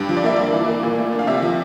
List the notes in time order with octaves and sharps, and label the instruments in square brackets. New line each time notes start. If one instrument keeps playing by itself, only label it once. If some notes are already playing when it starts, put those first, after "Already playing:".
Already playing: [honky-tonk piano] G2 G4
F3
D5
A#3 E5
G2 D5
E3
A#3
A#2
A3
D4
F5
C3 E5
F3